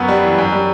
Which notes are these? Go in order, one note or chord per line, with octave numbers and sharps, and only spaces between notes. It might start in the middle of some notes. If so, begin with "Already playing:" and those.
Already playing: F#2 B3 F#4
G3
E3
F#2
G3